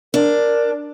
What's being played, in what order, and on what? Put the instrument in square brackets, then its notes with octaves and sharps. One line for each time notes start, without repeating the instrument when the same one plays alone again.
[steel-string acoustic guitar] D4 [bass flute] A#4